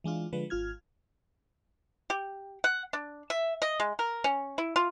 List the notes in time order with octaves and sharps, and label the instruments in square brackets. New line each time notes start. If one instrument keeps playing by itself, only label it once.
[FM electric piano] E3 G#3 D4 F4
D3 F3 G#3 B4
G#1 F4 F6 G#6
[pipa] G4
F#5
D4
E5
D#5
G#3
A#4
C#4
E4
F4